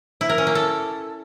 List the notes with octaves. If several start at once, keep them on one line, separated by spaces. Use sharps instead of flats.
E4
A#4
C#4
A#3
A4